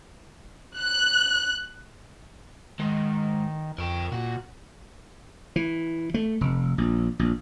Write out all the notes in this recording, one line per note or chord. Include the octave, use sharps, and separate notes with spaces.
F#6
G#2 D#3
F2 A#4 G5
A#2 F#4
E3
A3
F1
A#1
A#1